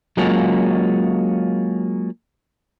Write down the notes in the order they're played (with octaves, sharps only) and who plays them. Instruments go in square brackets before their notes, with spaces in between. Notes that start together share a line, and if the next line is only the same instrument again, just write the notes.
[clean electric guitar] F#3 G#3 A#3 C#4 F4 F#4